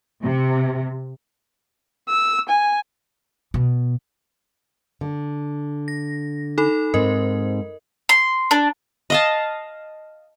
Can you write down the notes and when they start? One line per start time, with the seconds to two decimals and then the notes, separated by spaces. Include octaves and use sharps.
0.23 C3
2.09 E6
2.49 G#5
3.54 B2
5.01 D3
5.88 A#6
6.58 D#4 A4 B5
6.94 G#2 C4 A#4 D#5
8.09 C6
8.51 D4
9.10 D#5 F5 A5